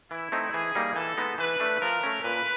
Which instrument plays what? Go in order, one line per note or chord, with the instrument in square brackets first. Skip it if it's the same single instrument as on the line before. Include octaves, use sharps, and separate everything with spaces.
[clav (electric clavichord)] E3 [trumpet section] E4
[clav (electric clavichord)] A3 C4 D#4
[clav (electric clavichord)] E3 [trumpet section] G#4
[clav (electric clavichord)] G3 A#3 D#4
[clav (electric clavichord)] E3 [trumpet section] A4
[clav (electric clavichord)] G#3 B3 D#4
[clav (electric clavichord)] E3 [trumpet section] B4
[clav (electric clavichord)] A3 D4
[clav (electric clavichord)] F3 [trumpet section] A#4
[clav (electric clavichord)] A3 C#4
[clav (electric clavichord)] A#2 [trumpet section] B4